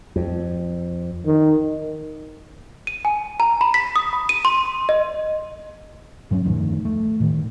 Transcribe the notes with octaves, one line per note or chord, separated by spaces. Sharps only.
F2
D#3
D#7
G#5
A#5
B5
B6
D#6
B5
D#7
C6
D#5
G2 F#3 C4 C#4
D1 F2 A2 D#3
A3
A2 D#3